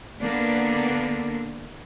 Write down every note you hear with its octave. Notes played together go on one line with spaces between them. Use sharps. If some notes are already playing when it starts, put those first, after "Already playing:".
D3 A#3 B3 D4